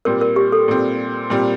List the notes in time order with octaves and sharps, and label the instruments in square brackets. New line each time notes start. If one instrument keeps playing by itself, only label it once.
[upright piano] A#2 G3 C4 [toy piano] A#4
[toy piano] A#4
G4
A4
[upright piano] A#2 G3 C4
A#2 G3 C4